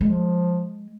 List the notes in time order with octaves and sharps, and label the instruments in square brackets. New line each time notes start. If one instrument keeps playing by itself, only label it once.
[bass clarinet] F3 [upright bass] G#3